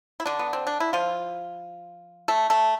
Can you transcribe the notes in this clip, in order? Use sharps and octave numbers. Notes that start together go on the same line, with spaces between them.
E4
D3 D4
B3
C4
D4
E4
F3 F4
A3 A4
A3 A4